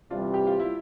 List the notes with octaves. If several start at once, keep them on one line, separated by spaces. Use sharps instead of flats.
C3 E3 G3 C4 D4 F4
G4
F4
E4